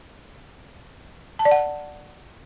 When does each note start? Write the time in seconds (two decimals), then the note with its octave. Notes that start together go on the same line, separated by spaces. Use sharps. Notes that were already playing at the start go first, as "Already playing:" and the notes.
1.39 A5
1.45 D5
1.51 F#5